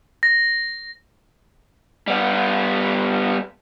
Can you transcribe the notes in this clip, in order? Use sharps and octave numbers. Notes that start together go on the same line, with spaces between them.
A#6
G3 B3